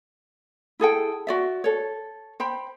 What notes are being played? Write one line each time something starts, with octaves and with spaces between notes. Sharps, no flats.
E4 G#4 A4 G5
F#4 D5 E5
A4 C#5
C5 G5 B5